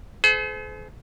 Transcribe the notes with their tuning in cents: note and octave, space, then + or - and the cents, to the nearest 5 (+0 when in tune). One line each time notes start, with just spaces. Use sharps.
G#4 +45 C5 -35